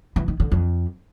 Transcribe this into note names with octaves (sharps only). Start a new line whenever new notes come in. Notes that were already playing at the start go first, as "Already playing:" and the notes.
E3
D#3
D3
F2